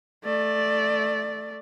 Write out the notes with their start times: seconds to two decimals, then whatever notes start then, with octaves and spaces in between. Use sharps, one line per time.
0.24 A3 D5